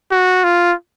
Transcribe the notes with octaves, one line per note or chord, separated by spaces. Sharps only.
F#4
F4